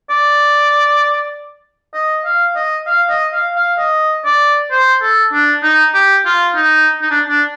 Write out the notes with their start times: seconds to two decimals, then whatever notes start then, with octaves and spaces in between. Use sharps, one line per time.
0.10 D5
1.94 D#5
2.25 F5
2.56 D#5
2.87 F5
3.10 D#5
3.33 F5
3.56 F5
3.79 D#5
4.25 D5
4.71 C5
5.02 A4
5.33 D4
5.63 D#4
5.94 G4
6.25 F4
6.56 D#4
7.02 D#4
7.11 D4
7.29 D4